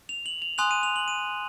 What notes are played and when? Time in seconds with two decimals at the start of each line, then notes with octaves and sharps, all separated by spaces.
0.09 F7
0.26 F#7
0.42 F7
0.58 G#5 C6 D#6 F#6 F7
0.71 D#7
0.83 F7
0.96 F#7
1.08 D#7